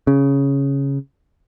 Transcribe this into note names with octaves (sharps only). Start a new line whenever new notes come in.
C#3